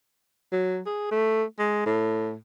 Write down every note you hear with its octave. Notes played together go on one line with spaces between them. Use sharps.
F#3
G#4
A3
G#3
A2